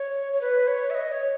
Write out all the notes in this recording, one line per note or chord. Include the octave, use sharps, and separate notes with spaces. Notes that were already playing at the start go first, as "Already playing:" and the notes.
Already playing: C#5
C#5
B4
C#5
E5
D#5
C#5